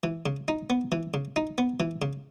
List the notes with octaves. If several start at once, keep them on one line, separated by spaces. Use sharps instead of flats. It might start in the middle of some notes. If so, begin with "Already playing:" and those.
E3
C#3
D#4
B3
E3
C#3
D#4
B3
E3
C#3